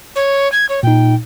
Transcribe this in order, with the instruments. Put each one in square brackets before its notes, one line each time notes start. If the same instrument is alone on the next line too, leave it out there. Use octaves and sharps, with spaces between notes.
[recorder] C#5
G#6
C#5
[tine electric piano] A#2 D#4 [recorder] G5